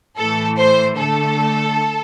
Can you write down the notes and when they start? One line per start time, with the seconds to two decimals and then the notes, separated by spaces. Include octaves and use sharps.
0.18 A2 E3 A3 A4
0.58 C5
0.97 D3 A3 A4